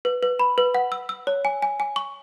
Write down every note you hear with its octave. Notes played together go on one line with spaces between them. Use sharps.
B4
B4
B5
B4
F#5
E6
E6
C#5
G#5
G#5
G#5
C#6